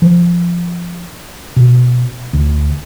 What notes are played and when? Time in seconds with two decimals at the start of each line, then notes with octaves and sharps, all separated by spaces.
0.02 F3
1.56 B2
2.33 D2